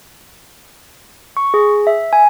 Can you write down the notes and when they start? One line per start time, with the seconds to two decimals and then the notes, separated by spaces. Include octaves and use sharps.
1.37 C#6
1.54 G#4
1.87 E5
2.13 G#5